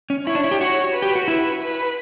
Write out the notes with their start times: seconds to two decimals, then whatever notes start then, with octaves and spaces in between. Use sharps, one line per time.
0.10 C#4
0.26 E4 C#5
0.35 D4
0.44 E4
0.51 G4
0.60 F#4 C#5
0.94 B4
1.02 G4
1.15 F#4
1.28 E4 B4
1.62 B4